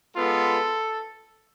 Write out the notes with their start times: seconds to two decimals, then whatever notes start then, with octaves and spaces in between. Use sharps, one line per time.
0.16 G#3 B3 F4 A4